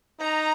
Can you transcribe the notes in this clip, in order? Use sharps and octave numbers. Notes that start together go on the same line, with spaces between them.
D#4 A#5